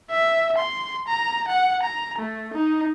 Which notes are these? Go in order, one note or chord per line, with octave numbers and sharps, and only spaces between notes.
E5
C6
A#5
F#5
A#5
A3
D#4